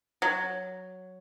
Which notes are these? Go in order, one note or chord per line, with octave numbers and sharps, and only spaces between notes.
F#3